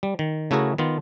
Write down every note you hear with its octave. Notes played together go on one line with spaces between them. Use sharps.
G3
D#3
C#3 A3 E4 F#4 G#4 A#4
D#3 B3 F4